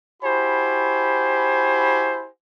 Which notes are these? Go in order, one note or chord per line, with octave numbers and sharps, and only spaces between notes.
E4 F#4 G4 C5 G#5 B5